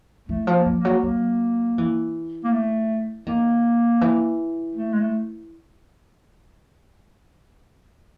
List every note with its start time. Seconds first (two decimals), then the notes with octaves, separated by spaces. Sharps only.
0.28 E3 A3
0.47 F3
0.54 A#3
0.66 F3
0.78 A#3
0.85 F#3
1.03 F#3 A#3
1.78 E3
2.44 A#3
2.53 A3
3.26 D#3 A#3
4.01 E3
4.75 A3
4.93 G#3
5.00 A3